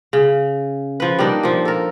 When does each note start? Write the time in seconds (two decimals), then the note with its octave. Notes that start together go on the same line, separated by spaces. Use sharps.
0.13 C#3
1.00 F3 B4
1.19 G3 A#3 D4 D#4
1.43 A#2 F3
1.65 A4 A#4